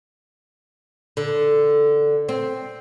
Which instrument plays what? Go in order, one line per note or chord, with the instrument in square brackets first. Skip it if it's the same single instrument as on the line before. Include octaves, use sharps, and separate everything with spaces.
[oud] D3
C4